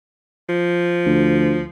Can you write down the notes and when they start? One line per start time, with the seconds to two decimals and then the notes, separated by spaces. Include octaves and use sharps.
0.49 F3
1.06 D2